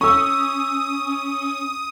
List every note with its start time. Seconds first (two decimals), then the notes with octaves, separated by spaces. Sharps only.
0.01 C#4 C#6 D#6 E6